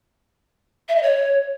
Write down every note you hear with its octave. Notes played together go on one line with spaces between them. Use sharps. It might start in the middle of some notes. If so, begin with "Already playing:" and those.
E5
D#5
C#5